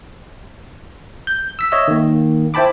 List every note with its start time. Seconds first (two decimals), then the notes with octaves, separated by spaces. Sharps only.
1.27 G6
1.59 E6 B6
1.72 C#5 D#5 E5 E6
1.88 D#3 A#3
2.54 E4 C5 G5 A5 B5 D6